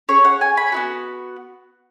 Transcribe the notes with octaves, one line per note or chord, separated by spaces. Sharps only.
C#4 G#4 C#5
F#5
G#5
B5
B3 D#4 F#4